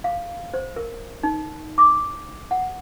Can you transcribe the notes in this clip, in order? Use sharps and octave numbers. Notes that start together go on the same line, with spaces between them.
F5
C5
A#4
D#4
D6
F#5